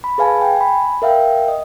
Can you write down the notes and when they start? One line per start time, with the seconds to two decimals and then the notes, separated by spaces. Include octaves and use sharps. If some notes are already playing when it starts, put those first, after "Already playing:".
0.04 B5
0.18 G#4 B4 F5 G#5 A5
0.41 G5 G#5
0.56 G#5 B5
1.02 A#4 E5 F5 G5
1.48 D#5